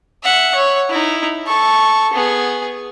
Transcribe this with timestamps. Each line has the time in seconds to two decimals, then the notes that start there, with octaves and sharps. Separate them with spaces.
0.24 E5 F#5
0.55 C#5
0.90 D#4 E4
1.47 A4 C#6
2.13 B3 G#4